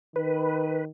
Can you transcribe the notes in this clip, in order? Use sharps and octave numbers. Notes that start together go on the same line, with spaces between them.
D#3 B4